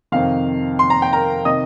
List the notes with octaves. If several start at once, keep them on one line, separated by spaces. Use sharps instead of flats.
F2 C3 D#3 F5
C6
A#5
G5
A#4 A#5
C3 D#3 D#5 D#6